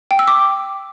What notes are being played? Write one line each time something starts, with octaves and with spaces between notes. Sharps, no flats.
G5
E6
D6